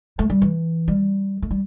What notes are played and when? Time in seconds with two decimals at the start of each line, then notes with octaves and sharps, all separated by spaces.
0.19 A3
0.30 G3
0.42 E3
0.88 G3
1.42 A3
1.51 G3